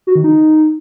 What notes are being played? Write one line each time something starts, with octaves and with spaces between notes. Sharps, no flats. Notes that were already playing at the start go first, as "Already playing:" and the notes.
F#4
D#3
D#4